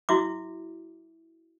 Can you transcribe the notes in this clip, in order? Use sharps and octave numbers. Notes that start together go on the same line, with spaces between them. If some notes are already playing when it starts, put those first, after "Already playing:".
E4 F#4 E5 D6